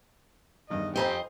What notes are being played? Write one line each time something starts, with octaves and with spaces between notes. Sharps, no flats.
E2 G2 D#3 D#5
F2 C4 G4 C5 D#5 G#5 A#5 B5